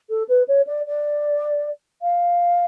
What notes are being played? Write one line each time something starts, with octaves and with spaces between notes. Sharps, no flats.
A4
B4
C#5
D5
D5
F5